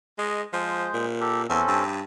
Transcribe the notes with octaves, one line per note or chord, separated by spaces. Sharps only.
G#3 D#5
F3 G#3 C5
A#2
G4 A4 A#4
E2 C4 C#4 A4
G2